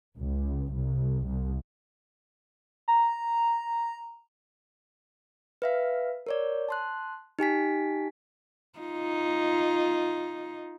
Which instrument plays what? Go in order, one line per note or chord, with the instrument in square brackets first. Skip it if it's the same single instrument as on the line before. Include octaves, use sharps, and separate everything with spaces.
[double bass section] C#2
C2
C2
[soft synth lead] A#5
[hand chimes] B4 E5 F5
A#4 C#5 D5
A5 C6 F#6
D#4 G4 G#5 B6
[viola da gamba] D#4 F4